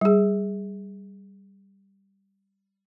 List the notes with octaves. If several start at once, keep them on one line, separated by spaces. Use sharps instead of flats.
G3 G#4